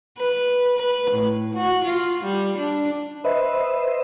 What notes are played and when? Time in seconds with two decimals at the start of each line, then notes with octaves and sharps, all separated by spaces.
0.18 B4
0.77 B4
1.11 A2
1.55 F#4
1.85 F4
2.24 G3
2.58 D4
3.24 B4 C5 D#5 E5